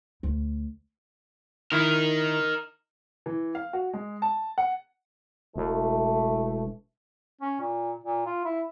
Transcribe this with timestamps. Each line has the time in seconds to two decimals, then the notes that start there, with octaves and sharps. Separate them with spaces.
0.23 D2
1.72 D#3 D#4 E4 A#4
3.26 E3
3.55 F5
3.73 F#4
3.94 G#3
4.22 A5
4.58 F#5
5.56 E1 E3 A3
7.41 C#4
7.61 A#2
8.04 A#2
8.26 F4
8.45 E4